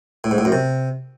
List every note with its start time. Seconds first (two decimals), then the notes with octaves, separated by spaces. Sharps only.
0.24 A2
0.31 G#2
0.38 A2
0.45 F#2
0.52 C3